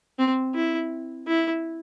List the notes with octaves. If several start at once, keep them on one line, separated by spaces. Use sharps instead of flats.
C4
E4
E4